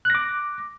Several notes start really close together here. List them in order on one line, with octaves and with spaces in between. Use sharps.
F#6 A#6 D6